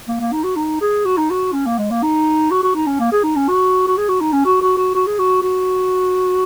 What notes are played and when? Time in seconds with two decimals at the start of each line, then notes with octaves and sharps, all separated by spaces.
0.08 A#3
0.20 A#3
0.33 D#4
0.44 F#4
0.56 D#4
0.81 G#4
1.05 F#4
1.17 D#4
1.30 F#4
1.53 C#4
1.66 A#3
1.78 G#3
1.91 A#3
2.02 D#4
2.51 F#4
2.63 F#4
2.75 D#4
2.87 C#4
3.00 A#3
3.12 G#4
3.23 D#4
3.36 C#4
3.48 F#4
3.87 F#4
3.97 G#4
4.09 F#4
4.21 D#4
4.33 C#4
4.45 F#4
4.61 F#4
4.77 F#4
4.95 F#4
5.07 G#4
5.19 F#4
5.42 F#4